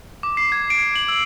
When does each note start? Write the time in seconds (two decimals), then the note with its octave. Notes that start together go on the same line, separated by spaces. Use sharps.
0.23 D6
0.37 C7
0.52 G#6
0.70 D7
0.96 F#7
1.08 E6